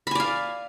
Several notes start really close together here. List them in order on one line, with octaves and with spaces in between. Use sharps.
B5 G#5 D5 F5